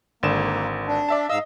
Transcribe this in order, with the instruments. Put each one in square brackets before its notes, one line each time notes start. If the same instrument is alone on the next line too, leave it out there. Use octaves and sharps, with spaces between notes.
[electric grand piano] G#1 D3 E7 [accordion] A#3
[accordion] D4
[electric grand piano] D5 E5 A5
[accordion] G#2 F5 E6 [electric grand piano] D#5